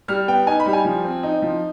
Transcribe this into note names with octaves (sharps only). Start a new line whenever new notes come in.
G3 F6
B3 G5
D#4 G#5
B5
G3
G#5
F3
C4
D#4
F3